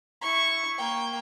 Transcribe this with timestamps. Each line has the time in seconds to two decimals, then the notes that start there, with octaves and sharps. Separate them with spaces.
0.21 E4 C#6
0.78 A#3 G5